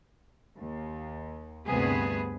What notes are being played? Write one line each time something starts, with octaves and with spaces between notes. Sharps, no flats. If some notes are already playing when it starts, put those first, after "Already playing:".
D#2
D2 G2 C3 B3 G#4 B4